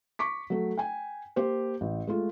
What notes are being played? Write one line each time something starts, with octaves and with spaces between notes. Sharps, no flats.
C#6 D6 B6
F#3 A3
G5 G#5
A#3 G4 C5
A1
G#3 A3 F4